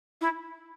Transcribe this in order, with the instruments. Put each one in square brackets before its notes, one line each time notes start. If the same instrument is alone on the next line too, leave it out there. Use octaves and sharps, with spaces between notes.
[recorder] E4